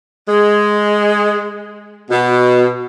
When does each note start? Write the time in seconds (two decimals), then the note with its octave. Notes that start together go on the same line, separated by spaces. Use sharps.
0.28 G#3
2.10 B2